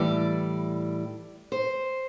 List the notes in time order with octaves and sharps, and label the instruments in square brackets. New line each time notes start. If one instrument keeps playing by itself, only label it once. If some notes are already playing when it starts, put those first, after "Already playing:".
Already playing: [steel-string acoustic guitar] A2 E3 G3 D5
C5